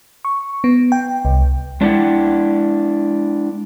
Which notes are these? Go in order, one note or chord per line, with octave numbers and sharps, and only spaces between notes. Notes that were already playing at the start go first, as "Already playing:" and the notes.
C#6
B3
G5
C2
G#3 D4 E4 D5 F#5 G5